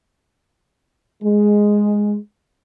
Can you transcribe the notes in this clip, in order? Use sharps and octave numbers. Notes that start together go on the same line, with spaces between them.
G#3